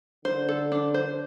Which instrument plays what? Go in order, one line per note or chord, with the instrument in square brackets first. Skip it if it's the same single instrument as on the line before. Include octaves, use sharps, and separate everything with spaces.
[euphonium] D3 [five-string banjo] C5
[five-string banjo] A4
D4
C5